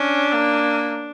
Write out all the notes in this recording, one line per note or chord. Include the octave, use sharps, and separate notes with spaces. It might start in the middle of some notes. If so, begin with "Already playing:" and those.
Already playing: C#4 D4
A#3